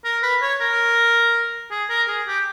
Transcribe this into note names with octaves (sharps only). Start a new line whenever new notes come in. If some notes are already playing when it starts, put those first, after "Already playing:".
A#4
B4
C#5
A#4
G#4
A#4
G#4
G4